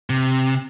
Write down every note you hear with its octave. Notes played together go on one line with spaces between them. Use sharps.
C3